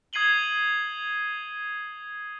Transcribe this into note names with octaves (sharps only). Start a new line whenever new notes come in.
D#6 G#6 C7 D#7 F#7 G7